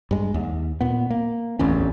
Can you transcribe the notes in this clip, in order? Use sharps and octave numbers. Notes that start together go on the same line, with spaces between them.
G2 G#3
D#2
A#2 B3
A#3
D1 A1 E2 C#4